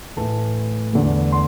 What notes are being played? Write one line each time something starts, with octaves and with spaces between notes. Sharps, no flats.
A2 E3 A3 A5
E2 D3 A3
C6